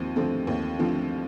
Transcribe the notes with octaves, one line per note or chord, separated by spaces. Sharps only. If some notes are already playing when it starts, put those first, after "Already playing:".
Already playing: D#2 F3 C4
D3 F3 A3 C4
D#2
D3 F3 A3 C4